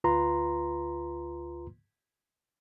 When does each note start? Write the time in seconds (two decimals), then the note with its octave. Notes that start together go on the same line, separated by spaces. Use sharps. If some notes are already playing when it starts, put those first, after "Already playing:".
0.04 D2 F4 B4 A#5 C6